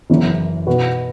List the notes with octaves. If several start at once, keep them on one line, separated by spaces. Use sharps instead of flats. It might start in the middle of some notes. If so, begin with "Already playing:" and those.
F#1 F#2 E3
B2 B3 F#4 B4